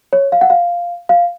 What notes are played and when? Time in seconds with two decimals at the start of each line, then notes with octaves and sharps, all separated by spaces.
0.13 C#5
0.32 F5
0.41 F#5
0.50 F5
1.09 F5